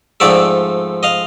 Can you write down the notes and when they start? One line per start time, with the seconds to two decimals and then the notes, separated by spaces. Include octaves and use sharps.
0.20 G#2 F3 A3 C4 D5 E5
1.03 D#5 F5